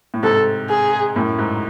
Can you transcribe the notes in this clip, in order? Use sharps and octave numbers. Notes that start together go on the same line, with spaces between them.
A2
G#2 C3 A4
G#4
F#2 A2
G#2